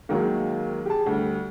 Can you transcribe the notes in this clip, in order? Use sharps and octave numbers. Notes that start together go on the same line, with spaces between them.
D#2 D#3 F#3 G#3 A#3
G4 G#4 A5
D2 G3